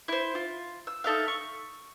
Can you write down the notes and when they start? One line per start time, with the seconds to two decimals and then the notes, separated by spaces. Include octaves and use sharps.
0.08 E4 C5
0.35 F4
0.87 E6
1.04 D#4 A4 E5 F5
1.28 C#6